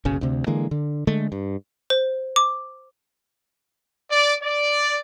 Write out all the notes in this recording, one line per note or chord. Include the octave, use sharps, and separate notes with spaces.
F#1 B1 C#3 C#4
D2 C3
D3 E3 G#3 A#3
D3
D3 G#3 A3
G2
C5
D6
D5
D5